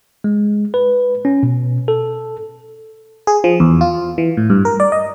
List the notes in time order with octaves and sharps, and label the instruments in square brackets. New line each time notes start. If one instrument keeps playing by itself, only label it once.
[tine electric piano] G#3
B4
C#4
B2
A4
[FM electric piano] G#4
F3
E2
F4
E3
A2
G2
A#4
D5
D#5